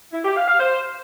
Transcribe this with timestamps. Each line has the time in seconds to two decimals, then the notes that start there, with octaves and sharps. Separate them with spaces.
0.12 E4
0.23 G4
0.35 F5
0.47 F5
0.59 C5